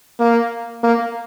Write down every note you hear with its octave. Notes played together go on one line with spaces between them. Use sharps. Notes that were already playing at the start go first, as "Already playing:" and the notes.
A#3
A#3